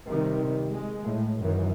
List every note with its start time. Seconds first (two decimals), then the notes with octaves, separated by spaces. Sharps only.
0.10 C3 D#3 G3
0.73 G#3
1.05 A2
1.42 F#2 D#3 E3